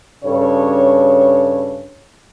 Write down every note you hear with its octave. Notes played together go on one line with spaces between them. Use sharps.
G2 C#3 A4 C#5